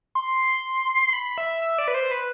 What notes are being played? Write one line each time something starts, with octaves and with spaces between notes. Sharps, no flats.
C6
B5
E5
E5
D5
B4
C5
B4